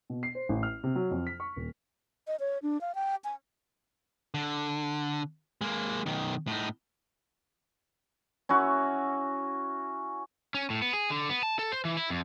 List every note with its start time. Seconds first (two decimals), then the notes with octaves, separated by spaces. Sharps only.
0.10 B2
0.23 C7
0.35 C5
0.49 A1
0.63 F6
0.84 C3
0.95 F#3
1.11 F2
1.27 B6
1.40 C#6
1.56 D#1
2.27 D#5
2.40 C#5
2.63 D4
2.81 F5
2.95 G5
3.24 G#5
4.34 D3
5.61 G#3 A#3
6.06 B1 D#3
6.47 A2 D#4
8.49 C#4 E4 F#4
10.55 C#4
10.70 A2
10.82 B3
10.93 G#4
11.10 D3
11.30 B3
11.43 A5
11.59 A4
11.72 C5
11.85 E3
11.97 E4
12.10 F2